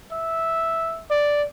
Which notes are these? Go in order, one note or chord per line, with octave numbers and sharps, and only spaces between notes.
E5
D5